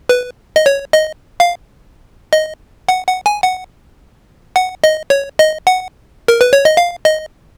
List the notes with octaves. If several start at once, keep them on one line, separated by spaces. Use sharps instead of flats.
B4
D#5
C#5
D#5
F5
D#5
F#5
F#5
G#5
F#5
F#5
D#5
C#5
D#5
F#5
A#4
B4
C#5
D#5
F5
D#5